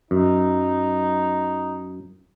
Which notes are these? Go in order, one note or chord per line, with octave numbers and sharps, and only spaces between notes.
F#2 D#4